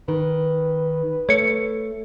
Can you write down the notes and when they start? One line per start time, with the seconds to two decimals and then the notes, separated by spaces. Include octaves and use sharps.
0.08 D#3 B4
1.29 A3 C#5 C#7